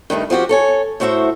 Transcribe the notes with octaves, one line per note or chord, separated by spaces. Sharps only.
G2 D#3 A3 D#4
F3 C4 F#4 G4
A4 C#5 G#5
A2 A3 F#4 C5 E5